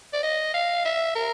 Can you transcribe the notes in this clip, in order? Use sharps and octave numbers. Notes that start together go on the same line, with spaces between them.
D5
D#5
F5
E5
A#4